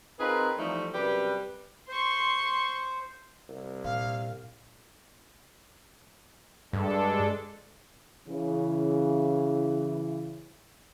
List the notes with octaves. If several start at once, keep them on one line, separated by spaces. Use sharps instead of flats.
C4 D#4 F4 G#4 A#4 B4
E3 F3 G3 A3 D#4
F#2 C3 G3 G4 B4
C5 C6 C#6
C2
A#2 F5
G2 G#3 D4 A4
C#3 E3